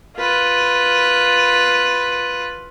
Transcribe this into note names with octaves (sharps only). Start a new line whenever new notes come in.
F4 B4